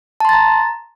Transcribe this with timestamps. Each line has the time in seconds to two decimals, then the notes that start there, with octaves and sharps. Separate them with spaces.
0.20 A5
0.25 C6
0.29 A6
0.33 A#5